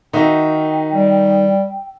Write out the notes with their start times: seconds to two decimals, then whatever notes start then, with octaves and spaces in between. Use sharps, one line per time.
0.13 D#3 D#4 F#4 E5 G5
0.94 G3